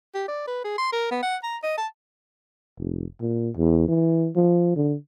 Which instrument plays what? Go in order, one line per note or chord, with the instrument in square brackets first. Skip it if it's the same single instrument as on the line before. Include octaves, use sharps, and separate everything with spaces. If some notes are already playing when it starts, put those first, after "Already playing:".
[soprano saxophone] G4
D5
B4
G#4
C6
A#4
B3
F#5
A#5
D#5
A5
[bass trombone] F1
A#2
E2
E3
F3
D3